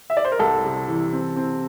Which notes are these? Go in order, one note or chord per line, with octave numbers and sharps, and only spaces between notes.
E5
D5
C5
A#4
C2 A4
C3
E3
C4
C4